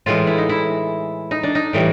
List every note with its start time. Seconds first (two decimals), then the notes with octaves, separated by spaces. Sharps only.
0.06 A2 E3 G#3 F4
0.27 E4
0.38 D#4
0.49 E4
1.31 D#4
1.43 D4
1.55 D#4
1.73 A2 E3 G3